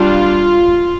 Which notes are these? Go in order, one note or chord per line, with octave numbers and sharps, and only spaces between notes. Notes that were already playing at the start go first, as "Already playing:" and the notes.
Already playing: G3 D4 F4